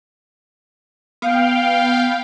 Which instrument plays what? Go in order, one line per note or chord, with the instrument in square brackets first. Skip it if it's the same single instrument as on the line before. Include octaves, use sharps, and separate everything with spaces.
[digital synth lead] B3 [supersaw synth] F5 G5